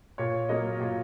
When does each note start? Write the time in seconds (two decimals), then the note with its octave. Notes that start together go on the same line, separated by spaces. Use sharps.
0.18 A#2 C#5
0.49 F#3 A#3 D#5
0.81 A#2